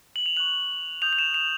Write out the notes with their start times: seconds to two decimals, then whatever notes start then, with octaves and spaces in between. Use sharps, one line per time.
0.16 F#7
0.26 F7
0.37 C#6 F#6 F#7
1.02 D#6 G6 F7
1.13 F7
1.19 E7
1.34 F7